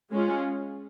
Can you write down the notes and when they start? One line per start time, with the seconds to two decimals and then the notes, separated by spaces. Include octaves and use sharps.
0.11 G#3 C#4 F4